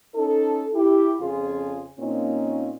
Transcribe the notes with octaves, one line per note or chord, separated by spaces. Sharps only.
C#4 D#4 A4
E4 G4
F2 C#3 F4 G#4
A#2 A#3 C4 C#4 D#4